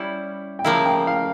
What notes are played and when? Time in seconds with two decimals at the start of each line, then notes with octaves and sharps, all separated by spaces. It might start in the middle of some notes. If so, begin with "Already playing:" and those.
Already playing: G3 C#4 E4
0.59 G5
0.64 C#3 F3 A#3 E4 F5
0.86 G5
1.07 F5